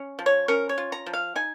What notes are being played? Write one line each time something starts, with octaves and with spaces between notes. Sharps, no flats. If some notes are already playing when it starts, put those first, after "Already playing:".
Already playing: C#4
F3
C#5
C#4 A#4
C#5
F4
A#5
F3
F5
D#4 G#5